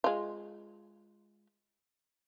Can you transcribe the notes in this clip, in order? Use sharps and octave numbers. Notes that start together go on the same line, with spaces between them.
G#3 F4